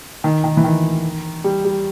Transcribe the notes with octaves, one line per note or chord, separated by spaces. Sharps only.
D#3
D#3
E3
D#3
G3
G3